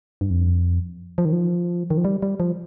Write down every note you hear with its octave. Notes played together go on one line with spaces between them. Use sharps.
G2
F2
F3
D#3
F3
D#3
F3
G3
G3
F3